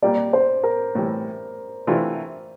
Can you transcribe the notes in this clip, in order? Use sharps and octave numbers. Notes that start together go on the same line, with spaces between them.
A#2 G3 A#3 D5
C5
A#4
A2 E3 G3
C3 E3 A3 D4 F4